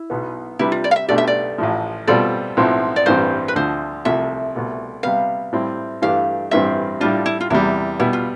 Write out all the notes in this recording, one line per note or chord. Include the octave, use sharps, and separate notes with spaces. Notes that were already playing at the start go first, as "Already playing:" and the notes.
Already playing: E4
B1 B2 B3
C3 G3 D4 E4 G4 B4
F4
D5
F5
E5
B1 B2 A3 D4 G4 D5
E5
D5
A1 A2 F3
B2 G3 C4 F4 A4 D5
B1 A2 F3 C4 E4
D5
A1 G2 E3 G3 C4 C5
B4
D2 D3 F3 C5
C2 C3 F3 A3 E5
C2 B2 A3
C3 G3 B3 F5
A2 G3 C4 E4
G2 E3 A3 D4 G4 F5
A1 G2 E3 G3 C4 E5
A2 G3 D4 F4
E4
F4
E2 C3 G3 E4
B2 G3 B3 E4
F4